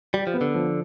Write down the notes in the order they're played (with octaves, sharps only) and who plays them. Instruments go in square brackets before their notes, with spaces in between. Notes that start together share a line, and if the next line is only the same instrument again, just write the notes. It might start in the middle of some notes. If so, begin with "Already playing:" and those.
[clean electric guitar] G3 [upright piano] G4
[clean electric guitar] F3
[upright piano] B3
[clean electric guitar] D3
[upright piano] F3